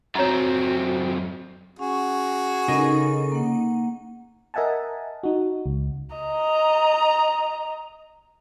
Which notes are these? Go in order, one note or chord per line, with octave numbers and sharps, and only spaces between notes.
F#2 C4 F#4 C#5 A#5
C#4 F#4 G#4
C#3 D#4 A4 A#4 C#6
A#3 F#5
A#4 D#5 E5 F#5 G#5 A5
D#4 F#4
C#2
D#5 A#5